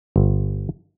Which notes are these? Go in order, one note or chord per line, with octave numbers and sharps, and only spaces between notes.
G1